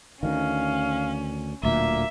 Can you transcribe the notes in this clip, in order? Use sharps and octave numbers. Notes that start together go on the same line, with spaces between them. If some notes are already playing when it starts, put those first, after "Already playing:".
D2 D#3 C#4 F5
D1 D2 A#2 A#3 E5